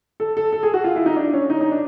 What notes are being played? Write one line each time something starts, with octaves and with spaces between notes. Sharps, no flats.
A4
A4
A4
G#4
F#4
F4
E4
D#4
D4
C#4
D#4
D#4
D4